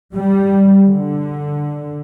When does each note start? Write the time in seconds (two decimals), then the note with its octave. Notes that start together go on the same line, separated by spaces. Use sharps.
0.15 G3
0.85 D3